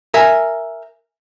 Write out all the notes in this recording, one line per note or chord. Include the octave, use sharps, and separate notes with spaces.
A#4 E5 G#5